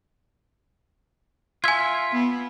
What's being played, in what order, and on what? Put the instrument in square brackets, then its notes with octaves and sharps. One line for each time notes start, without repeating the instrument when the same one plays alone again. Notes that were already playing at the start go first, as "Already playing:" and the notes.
[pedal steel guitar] F4 E5 [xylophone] G#5 G#6
[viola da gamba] B3